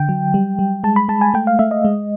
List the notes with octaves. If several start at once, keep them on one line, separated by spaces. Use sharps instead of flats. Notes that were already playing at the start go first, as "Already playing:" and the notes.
Already playing: D3 G5
F#3
G3
G3
G#3 A5
B5
G#3 A5
G#5
A3 G5
F5
A3 E5
D#5
G#3